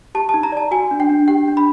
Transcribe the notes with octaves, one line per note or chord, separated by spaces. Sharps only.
G4 A5
A5
D#4
A#5
D5 A5
F#4 G#5
D4
G5
D4
G4 G5
D4
B5